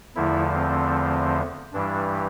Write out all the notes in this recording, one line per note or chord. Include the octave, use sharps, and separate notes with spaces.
E2 D3 F3 A3 E4
C4
G2 E3 G3 D4